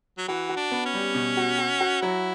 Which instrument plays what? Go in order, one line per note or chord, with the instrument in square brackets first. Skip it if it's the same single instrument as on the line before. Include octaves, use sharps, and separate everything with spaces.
[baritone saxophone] F#3
[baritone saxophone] E3 [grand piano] F#4
[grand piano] F#4
[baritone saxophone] D4
[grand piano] B3
[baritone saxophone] C#4
[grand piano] G3
B2
F#4
F#4
F#4
[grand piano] F#3 [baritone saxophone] E4